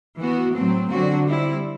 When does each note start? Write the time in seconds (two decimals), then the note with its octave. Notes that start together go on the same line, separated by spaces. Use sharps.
0.18 E3 B3 F#4
0.54 A2 F#3 A3 C4
0.90 D3 F#3 C4 F#4
1.27 G3 C4 E4